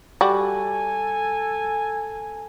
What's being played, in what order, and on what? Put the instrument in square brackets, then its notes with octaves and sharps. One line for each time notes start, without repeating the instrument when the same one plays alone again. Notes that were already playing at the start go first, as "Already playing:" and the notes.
[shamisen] G3 F#4 [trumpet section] A4 G#5